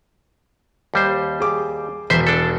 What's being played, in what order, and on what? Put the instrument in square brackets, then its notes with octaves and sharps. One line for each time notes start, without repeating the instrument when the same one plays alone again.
[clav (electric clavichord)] D#2 G3 C5
[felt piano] G#4 D6
[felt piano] E1 B6 [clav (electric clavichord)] C5 E5
[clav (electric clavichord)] D4 A4